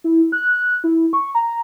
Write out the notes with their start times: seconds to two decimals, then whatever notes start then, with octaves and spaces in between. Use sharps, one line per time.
0.04 E4
0.32 F#6
0.84 E4
1.13 C#6
1.35 A#5